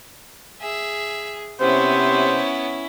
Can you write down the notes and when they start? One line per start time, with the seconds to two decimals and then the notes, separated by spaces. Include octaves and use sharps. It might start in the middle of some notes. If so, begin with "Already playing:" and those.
0.61 G#4 E5
1.60 C3 B3 C#4 E4 C5 C#5